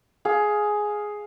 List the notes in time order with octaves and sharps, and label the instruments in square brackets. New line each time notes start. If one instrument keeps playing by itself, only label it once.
[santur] G#4 F5